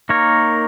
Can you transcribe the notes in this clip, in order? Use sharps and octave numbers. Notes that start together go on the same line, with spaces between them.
A#3 D#4 A#4 C#5